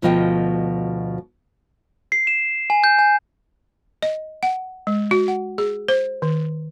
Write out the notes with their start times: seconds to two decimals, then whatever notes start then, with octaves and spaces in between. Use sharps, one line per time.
0.02 D2 B2 F3 F4 D#5 G5
2.12 C7
2.27 E7
2.70 G#5
2.84 G6
2.99 G#5
4.02 D#5
4.43 F#5
4.87 G#3
5.11 F#4
5.28 F#5
5.58 G#4
5.88 C5
6.22 D#3